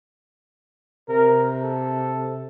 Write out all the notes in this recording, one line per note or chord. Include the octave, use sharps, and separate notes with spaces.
C3 A#4
A4